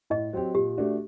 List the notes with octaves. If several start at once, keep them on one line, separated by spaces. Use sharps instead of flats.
A2 D#5
F#3 C4 G4
A#2 G4
A3 D4 F#4